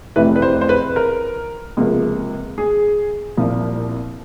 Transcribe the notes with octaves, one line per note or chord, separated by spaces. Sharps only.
F1 F2 C3 E3 A3 B4
B4
C5
C5
B4
A#4
C#2 C3 F3 A#3
G#4
C2 A#2 F3